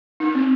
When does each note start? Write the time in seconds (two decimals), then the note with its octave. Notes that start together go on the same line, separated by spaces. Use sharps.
0.20 D#4
0.35 C4